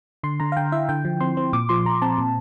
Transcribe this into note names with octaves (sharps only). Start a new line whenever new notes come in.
D3 C6
D3 A#5
F5
D3 G5
E4 E5
D3 G5
F3
C4 C6
C4
A#2 D6
F3 C6
F3 A#5
C4 A5
A#2